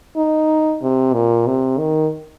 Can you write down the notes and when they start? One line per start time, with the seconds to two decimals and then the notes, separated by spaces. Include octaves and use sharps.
0.16 D#4
0.82 C3
1.14 A#2
1.46 C3
1.78 D#3